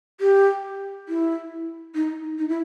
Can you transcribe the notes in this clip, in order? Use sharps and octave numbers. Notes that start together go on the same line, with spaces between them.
G4
E4
D#4
D#4
E4